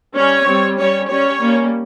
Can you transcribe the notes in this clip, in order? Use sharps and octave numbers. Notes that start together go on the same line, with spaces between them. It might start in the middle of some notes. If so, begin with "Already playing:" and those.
G3 C#4 C#5
G3 C4
G3 C#4 C#5
G3 C#4 C#5
G3 A#3 C#4